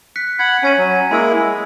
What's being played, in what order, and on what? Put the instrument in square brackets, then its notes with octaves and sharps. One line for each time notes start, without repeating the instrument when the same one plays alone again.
[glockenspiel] F#6 B6 C#7
[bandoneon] F#5 B5 [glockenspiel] G#6
[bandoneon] C#4 [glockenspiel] G#5 G#6 D#7
[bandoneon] F#3
[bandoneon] G#3 A#3 E4 [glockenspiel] B5 E6
[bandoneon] G#3 [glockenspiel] G#5